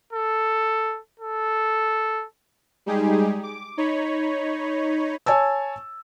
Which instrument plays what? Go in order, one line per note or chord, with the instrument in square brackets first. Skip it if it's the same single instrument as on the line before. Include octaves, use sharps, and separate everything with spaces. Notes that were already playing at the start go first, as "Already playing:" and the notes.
[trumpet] A4
A4
[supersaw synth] G3 G#3 D#4 G4 G#4
D6
D#4 C#5 B5
[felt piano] C#5 G#5 A5 E6